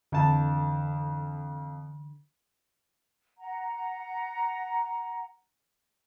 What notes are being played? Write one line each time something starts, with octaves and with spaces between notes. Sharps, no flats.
F2 D3 E3 A5
F#5 A#5